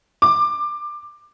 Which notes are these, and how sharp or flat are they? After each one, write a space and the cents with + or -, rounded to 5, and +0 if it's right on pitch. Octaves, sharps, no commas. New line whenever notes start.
D6 +20